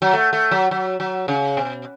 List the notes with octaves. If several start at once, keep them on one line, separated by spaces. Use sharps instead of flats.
F#3
A3
A3
F#3
F#3
F#3
C#3
B2